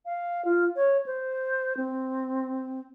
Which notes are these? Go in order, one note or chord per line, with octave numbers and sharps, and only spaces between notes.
F5
F4
C#5
C5
C4